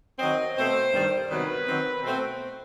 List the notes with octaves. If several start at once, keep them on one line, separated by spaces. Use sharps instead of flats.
D#3 F#3 C4 D#5
B2 A3 C4 C5
G2 D#3 G3
C3 D#3 F#3 B3 B4
D#3 F#3 C4
B2 A3 C4